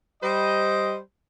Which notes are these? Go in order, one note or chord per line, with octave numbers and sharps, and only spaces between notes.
G3 C5 D#5